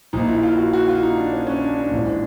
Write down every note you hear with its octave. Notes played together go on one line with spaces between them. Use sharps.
A#1 A#2 D#4
E4
F4
F#4
F#4
F4
D#4
D4
C#4
C#4
D4
D4
A#1 G#2 E3